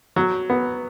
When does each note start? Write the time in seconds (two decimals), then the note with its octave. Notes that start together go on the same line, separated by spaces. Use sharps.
0.16 F#3
0.50 B3